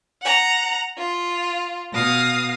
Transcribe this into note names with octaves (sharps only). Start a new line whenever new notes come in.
F#5 A#5
F4
B2 F5 D#6 A#6